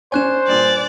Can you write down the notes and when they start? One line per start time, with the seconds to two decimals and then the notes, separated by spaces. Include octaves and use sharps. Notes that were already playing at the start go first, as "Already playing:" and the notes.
0.12 C#4 D4 C5 C#5 G#5 F#6 E7
0.48 G2 A#2 D5